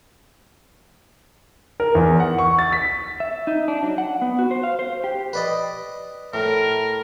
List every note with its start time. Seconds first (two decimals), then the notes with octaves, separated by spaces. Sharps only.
1.80 A#4
1.95 E2
2.20 F#5
2.38 C#6
2.59 A6
2.72 B6
3.20 E5
3.47 D#4
3.68 D4
3.82 F#3
3.98 F#5
4.22 B3
4.39 F#4
4.51 C5
4.63 F5
4.79 C5
5.04 G4
5.33 B4 D5 D#5
6.34 A2 A#4